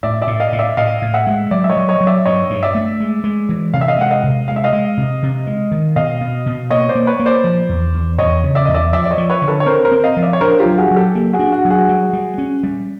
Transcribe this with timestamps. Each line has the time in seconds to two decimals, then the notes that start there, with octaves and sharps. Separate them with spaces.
0.03 A2 D5 E5
0.22 D5 E5
0.27 A2
0.40 D#5 F5
0.52 A2
0.59 D5 E5
0.77 A2 D#5 F5
1.02 A2
1.14 E5 F#5
1.27 G#3
1.51 F#3 D5 E5
1.64 E5
1.70 C#5 D#5
1.77 F#3
1.89 C#5 D#5
2.01 F#3
2.07 D5 E5
2.25 G2 C#5 D#5
2.50 G2
2.63 D5 E5
2.75 A3
3.00 G#3
3.24 G#3
3.49 E3
3.74 C3 F5
3.81 E5
3.88 D#5 F5
3.99 G#3 F#5
4.11 D#5 F5
4.23 C3
4.48 G#3 F5
4.56 E5
4.64 D#5 F5
4.73 G#3
4.97 C3
5.23 C3
5.47 G#3
5.71 D#3
5.96 B2 D#5 F5
6.20 B2
6.46 B2
6.70 A#3 C#5 D#5
6.89 C5 D5
6.95 A#3
7.07 B4 C#5
7.20 A#3
7.26 C5 D5
7.44 F3
7.69 E2
7.94 E2
8.18 E2 C#5 D#5
8.44 C#3
8.55 D5 E5
8.65 E2 D#5
8.74 D5 E5
8.93 F3 D5 E5
9.05 D5
9.11 C#5 D#5
9.18 F3
9.30 B4 C#5
9.42 D3
9.48 A4 B4
9.60 C#5
9.66 C4 A#4 C5
9.85 A#4 C5
9.92 C4
10.04 D#5 F5
10.17 F3
10.22 D5 E5
10.33 C#5
10.41 D4 A#4 C5
10.59 F4 G4
10.66 F#3
10.78 F#4 G#4
10.91 F#3
10.96 G4 A4
11.15 A#3
11.33 F#4 G#4
11.39 D4
11.52 F#4
11.65 F#3
11.70 F#4 G#4
11.89 G3
12.13 G3
12.38 C#4
12.63 G3